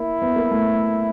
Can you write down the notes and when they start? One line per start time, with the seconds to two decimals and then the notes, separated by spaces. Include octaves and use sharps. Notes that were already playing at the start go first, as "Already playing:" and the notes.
Already playing: A#3 E4
0.22 B3
0.36 A#3
0.51 A3